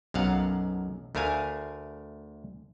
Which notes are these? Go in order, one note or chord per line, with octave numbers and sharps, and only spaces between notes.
B1 F#2 F5 F#5
D2 A3 A#4 F5 G#5